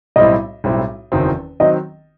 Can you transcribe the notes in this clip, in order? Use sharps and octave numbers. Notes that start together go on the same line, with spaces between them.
B1 A2 G3 C4 E4 D#5
B1 A2 G3 C4 E4
F#1 E2 D#3 F#3 C4
D#3 F#3 C4 D#5